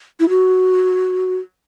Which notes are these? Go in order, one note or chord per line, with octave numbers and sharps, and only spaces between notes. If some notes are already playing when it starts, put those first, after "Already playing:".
E4
F#4